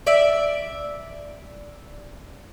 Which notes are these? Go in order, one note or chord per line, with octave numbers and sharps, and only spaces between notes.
D5 E5